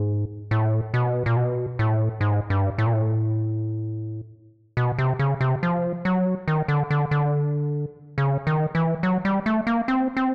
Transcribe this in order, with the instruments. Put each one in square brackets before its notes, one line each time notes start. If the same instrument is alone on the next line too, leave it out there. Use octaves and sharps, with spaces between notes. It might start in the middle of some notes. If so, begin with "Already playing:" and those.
Already playing: [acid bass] G#2
A2
B2
A#2
B2
A2
G#2
G2
A2
A#2
A2
B2
C3
C#3
C3
F3
F#3
D#3
D3
D3
D3
C#3
D#3
E3
F#3
G3
A3
A#3
C4
C4